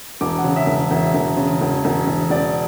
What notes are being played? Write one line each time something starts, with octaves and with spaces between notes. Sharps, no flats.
E1 D6
F#5
C#3
E5
E1
E5
E1 E5
E1
C#3
E1
E1
E1
E1 D5